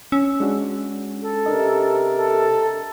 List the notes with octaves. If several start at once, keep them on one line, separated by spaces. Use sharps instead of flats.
C#4 E6
G#3 D4 F#4
A4
C3 D4 A#4 D#5
A4